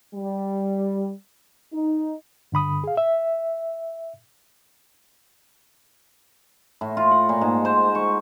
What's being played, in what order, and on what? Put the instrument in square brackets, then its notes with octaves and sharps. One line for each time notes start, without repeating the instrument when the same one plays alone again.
[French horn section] G3
D#4
[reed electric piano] G2 D3 B5 D#6
G#4 F5
E5
[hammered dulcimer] A2
F4
F#5
A#2
G#2
C5
C#6